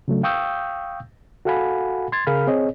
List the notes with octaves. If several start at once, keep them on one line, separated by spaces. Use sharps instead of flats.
C#3 F#3 A3 D4
F5 G5 C#6 D#6 E6 G6
F#4 A4 F5 F#5 G#5 B5
C6 G#6 A6
C#3 G#4 A#4 F5 B5 F6
C4 G#4 C#5 D#5